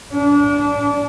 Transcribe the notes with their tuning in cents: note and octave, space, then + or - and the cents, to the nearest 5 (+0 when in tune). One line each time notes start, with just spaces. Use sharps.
D4 -30